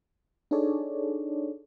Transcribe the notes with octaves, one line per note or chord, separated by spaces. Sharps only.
D4 D#4 G#4 A4 C#5 D5